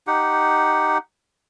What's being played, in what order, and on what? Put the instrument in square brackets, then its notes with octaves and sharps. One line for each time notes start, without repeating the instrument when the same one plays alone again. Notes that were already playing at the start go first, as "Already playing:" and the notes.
[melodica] D#4 G4 F#5